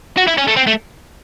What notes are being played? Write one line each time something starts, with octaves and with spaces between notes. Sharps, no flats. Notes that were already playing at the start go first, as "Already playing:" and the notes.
F#4
E4
C#4
A3
C4
A3